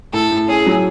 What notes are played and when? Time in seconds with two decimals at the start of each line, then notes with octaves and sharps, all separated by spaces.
0.13 A2 A4
0.31 A2
0.48 C#4 G#4
0.66 F#3